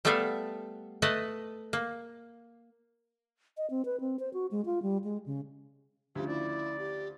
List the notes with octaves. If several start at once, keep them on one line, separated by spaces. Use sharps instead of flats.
G3 A3 B3 A4 E5 F5
A3 B4 D#5 A5
A#3
D#5
C4
B4
C4
C5
F#4
G#3
F4
G3
G#3
C#3
D2 C#3 F3 G4
E4 D5
G4